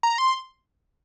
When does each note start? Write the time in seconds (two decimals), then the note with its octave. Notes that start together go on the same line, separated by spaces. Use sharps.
0.03 A#5
0.18 C6